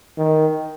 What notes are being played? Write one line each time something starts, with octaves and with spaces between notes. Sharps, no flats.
D#3